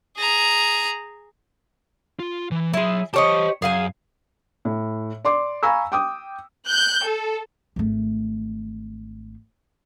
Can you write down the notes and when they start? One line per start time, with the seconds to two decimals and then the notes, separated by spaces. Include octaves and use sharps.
0.17 G#4 A#5
2.20 F4
2.51 E3
2.74 F#3 E4 G#4 C6
3.14 G4 C5 C#5 D#5 A5
3.62 F#2 G#4 F5 G#5
4.65 A2
5.25 D5 C6 D6
5.63 F5 G#5 A#5 B5 C#6 E6
5.92 G5 D6 D#6
6.67 F#6 G6
7.05 A4
7.76 G#1 A3